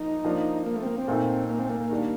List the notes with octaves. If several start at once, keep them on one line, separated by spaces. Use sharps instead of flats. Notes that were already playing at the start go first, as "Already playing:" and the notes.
Already playing: F3 A#3 D#4
F3 A#3 D4
A#3
A3
C4
A#3
C4
A#2 A3 D#4
A#3
C4
A#3
A#3
D#3 G3 D4